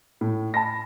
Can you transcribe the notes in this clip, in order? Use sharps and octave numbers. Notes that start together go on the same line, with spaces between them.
A2
A5 B5 A#6